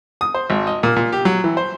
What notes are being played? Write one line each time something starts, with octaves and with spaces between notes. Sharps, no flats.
D#6
C5
G#1
D#5
A#2
A#2
G4
F#3
E3
C5